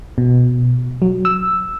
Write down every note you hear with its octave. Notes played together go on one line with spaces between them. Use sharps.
B2
F#3
E6